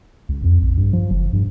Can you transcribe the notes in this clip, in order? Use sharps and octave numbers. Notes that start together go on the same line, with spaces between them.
C#2
F2
A#1
G2
F3
F#1
G2